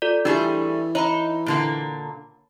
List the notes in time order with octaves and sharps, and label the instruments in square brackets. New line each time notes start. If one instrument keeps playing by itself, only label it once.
[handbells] F4 A4 D5
[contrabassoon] E3 [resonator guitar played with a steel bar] G3 A3 G#4 [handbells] D4 G4
[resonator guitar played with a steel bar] D#4 [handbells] C#5 A#5 B5
[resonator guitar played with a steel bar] A#2 D3 A#3